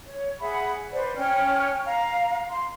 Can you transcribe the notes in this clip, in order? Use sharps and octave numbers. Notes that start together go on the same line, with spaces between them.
C#5
G#4 E5 F#5 B5
B4 C5 D5
C#4 G5 F6
F5 A#5
C6